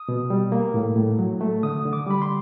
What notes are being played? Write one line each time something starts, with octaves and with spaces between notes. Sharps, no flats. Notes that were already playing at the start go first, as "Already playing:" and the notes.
Already playing: D#6
B2
G3
A#3
A2
A2
F#3
A3
D3 D#6
D3
D6
G3 B5
C6